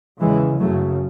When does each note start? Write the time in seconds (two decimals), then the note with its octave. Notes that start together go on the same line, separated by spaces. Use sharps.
0.20 E2 C#3 E3 G#3
0.59 F#2 C#3 F#3 A3